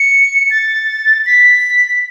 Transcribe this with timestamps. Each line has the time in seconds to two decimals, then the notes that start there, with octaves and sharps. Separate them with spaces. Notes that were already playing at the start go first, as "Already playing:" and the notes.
Already playing: C#7
0.51 A6
1.26 B6